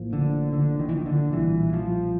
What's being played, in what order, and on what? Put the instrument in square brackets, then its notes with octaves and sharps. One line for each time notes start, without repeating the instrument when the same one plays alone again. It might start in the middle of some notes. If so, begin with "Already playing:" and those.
Already playing: [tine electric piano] A1 A2 F3 A#3
[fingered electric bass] D3
D3
D#3
E3
D#3
D3
[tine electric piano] B1 A#2 G3 [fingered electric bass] E3
[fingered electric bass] F3